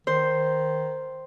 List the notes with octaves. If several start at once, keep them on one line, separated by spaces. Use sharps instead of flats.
D#3 C5